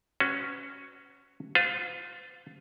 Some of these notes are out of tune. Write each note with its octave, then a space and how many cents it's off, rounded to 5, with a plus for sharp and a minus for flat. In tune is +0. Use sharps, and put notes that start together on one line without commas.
C#4 +0 F#4 +0 B4 +40
F4 +15 C5 -40